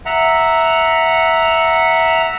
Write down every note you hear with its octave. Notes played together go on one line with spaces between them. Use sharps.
E5 F#5 A#5